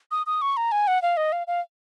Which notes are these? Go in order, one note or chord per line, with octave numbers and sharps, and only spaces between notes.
D#6
D#6
C#6
A#5
G#5
F#5
F5
D#5
F5
F5